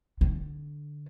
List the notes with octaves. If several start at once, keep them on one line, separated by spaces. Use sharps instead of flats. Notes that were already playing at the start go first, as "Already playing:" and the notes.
D3